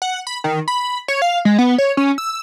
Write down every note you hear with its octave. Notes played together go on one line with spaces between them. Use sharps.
F#5
B5
D#3
B5
C#5
F5
G#3
B3
C#5
C#4
E6